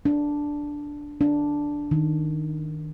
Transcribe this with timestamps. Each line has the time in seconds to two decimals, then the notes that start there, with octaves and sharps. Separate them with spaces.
0.05 D4
1.21 D4
1.91 D#3